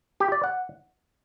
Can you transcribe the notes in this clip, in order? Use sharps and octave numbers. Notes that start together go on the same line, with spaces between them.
G4
D5
F#5